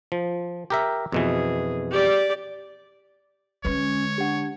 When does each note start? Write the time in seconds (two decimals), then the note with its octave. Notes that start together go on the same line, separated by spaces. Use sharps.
0.12 F3
0.70 G4 A#4 E5
1.12 F2 B2 E3 G#4
1.91 G4 D5
3.65 D3 G#3 C#4 B4 C#5
4.18 D4 G4 F#5